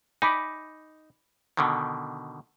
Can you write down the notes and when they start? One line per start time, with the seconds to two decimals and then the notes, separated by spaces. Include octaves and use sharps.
0.22 D#4 G#5 B5 D6
1.57 B2 D3 D#3